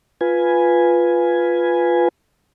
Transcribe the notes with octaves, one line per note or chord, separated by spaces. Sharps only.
F4 B4 G#5